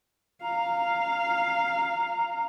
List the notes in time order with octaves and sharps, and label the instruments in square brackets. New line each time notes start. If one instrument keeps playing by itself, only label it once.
[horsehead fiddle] F5 [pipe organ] A#5